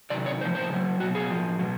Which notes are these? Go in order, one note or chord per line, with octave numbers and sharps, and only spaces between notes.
C3 D#3 F#3 D5
C#5
A2 F3 C5
C5
C#3 F#3
B2 F#3 F#4
G#4
A2 F3
B2 F#3